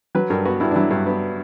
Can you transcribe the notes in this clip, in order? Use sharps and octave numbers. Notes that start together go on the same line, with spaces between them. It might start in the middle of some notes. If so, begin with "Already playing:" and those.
F#3 B4
G2 A#4
B3 F#4
G2 E4
D4
F#3 E4
G2
B3